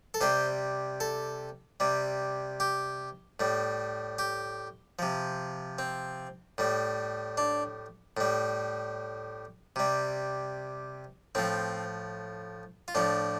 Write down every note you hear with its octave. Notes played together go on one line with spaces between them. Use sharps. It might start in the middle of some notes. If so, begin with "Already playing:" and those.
A4
C3 G3 C5
A4
C3 G3
G4
A2 G3
G4
C3 F3
C4
A2 G3
D4
A2 G3
C3 G3
A2 F3 C4
F4
A2 F3 D4